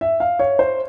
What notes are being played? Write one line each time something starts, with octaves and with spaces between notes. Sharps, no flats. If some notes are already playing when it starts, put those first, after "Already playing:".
E5
F5
C#5
C5